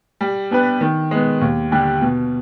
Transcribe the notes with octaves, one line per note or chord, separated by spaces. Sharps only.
G3
B3 D4 G4 B4
D#3
G#3 B3
D#2
D3 G3 D4 G4
B2